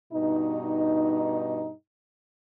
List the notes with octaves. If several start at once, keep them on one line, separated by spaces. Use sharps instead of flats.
G2 B2 D#4